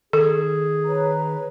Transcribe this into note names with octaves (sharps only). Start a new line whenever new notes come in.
D#3 G#4 A4
B4 C#5 A#5